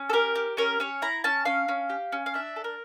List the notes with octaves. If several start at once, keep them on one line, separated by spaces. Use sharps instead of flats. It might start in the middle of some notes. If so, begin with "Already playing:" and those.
Already playing: C#4
A4
G4 A#4
G4
C#4 A#4
C#4 C#5
E4 A#5
C#4 A5
C#4 F5
C#4
G4
C#4
F5
D4 E5
A4
A#4